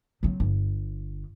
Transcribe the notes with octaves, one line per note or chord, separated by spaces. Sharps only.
F#3 C4
G1